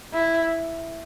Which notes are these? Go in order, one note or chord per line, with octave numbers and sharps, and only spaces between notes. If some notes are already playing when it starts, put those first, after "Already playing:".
E4